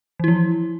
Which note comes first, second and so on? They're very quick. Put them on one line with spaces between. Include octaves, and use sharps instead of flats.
E3 E4 F3